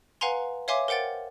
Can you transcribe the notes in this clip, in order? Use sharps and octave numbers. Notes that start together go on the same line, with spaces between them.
B4 F5 F#5 G#5 A#5 C6
C#5 E5 F5 G#5 C6 D6
A#4 C5 F#5 G5 A6